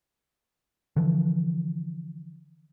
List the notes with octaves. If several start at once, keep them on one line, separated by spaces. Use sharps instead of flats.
D3 E3 F3